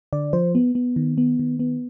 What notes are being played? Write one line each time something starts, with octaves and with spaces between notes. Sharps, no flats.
D3 D5
F3 C5
B3
B3
D#3
B3
D#3
B3